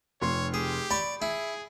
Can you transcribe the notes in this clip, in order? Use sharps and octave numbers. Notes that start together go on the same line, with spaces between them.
F1 C#5 C6 C7
G4 G#4
D5 B5 C#6
E4 G#4